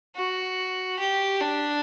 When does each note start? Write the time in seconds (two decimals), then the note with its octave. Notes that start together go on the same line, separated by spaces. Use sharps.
0.16 F#4
0.99 G4
1.41 D4